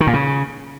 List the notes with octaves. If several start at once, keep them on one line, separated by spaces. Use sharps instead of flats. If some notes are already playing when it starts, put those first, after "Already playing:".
D#3
A#2
C#3